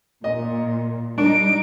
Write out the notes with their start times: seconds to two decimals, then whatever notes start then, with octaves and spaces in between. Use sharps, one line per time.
0.24 A#2 D#5
1.18 G3 D4 D#4 D7